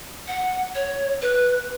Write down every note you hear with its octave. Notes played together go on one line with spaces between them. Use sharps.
F#5
C#5
B4